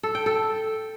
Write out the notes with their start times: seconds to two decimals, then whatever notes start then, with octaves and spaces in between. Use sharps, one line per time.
0.03 A4
0.15 G5
0.26 A4